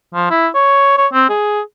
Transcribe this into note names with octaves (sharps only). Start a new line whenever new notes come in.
F3
E4
C#5
C#5
C4
G#4